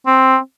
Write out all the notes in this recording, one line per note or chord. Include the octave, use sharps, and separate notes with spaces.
C4